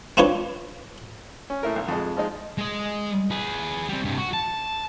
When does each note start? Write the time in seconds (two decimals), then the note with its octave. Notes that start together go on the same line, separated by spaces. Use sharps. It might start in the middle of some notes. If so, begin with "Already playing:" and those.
0.17 C4 D4 D#4 F4 B4 C#5
1.50 C#4
1.63 A2 E4 A#4
1.76 B1
1.88 F2 G#3
2.17 F3 G#3 D#4
2.58 G#3 D#5
3.31 G#4 B4
3.89 G3 C4
4.05 G2 C3
4.18 F#4
4.33 A5